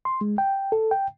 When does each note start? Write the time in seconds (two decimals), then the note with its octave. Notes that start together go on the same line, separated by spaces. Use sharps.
0.05 C6
0.21 G#3
0.38 G5
0.72 A4
0.91 G5